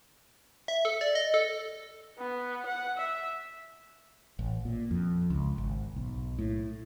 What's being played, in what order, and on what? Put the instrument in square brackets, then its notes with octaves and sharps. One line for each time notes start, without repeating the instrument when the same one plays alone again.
[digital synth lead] E5
A4
D5
D#5
A4
[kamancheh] B3
F#5
E5
[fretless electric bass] A1
A#2
F2
C#2
G#1
B1
A2